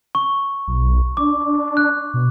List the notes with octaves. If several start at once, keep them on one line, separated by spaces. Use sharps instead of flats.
C#6
B1
D4 D6
F#6
B2